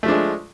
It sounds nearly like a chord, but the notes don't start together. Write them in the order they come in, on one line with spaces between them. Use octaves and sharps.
A3 F3 D4 G#3